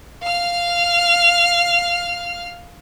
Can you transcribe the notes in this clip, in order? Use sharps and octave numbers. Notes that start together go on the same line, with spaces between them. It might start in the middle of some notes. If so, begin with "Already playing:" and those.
F5 F6